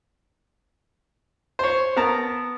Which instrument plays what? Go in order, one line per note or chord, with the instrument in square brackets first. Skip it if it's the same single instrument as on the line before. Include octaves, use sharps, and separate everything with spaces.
[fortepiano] C5 C#5
B3 A#4 A5 A#5